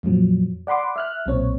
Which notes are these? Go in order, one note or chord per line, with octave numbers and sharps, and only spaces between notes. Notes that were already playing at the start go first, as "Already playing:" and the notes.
F2 A#2 F3 F#3
D5 F#5 B5 C6 D6
E5 F6 F#6
B1 A#2 C4 C#5